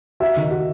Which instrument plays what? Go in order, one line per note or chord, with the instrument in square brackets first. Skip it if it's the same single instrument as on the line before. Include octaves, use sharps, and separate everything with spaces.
[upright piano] F#4 [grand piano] E5
[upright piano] D#3
F#4